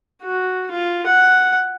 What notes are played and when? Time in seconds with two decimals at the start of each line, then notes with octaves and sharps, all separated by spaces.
0.23 F#4
0.71 F4
1.06 F#5